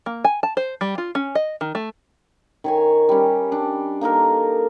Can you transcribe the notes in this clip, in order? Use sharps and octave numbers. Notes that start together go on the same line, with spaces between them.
A#3
G#5
A5
C5
G3
F4
C#4
D#5
D#3
A3
D#3 C#5 G#5
G3 C#4
D4
A#3 D#4 A4 A#4